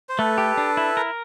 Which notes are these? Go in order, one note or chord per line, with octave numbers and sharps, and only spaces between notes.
C5
A3 A4 B4
G4
D4
E4
A#4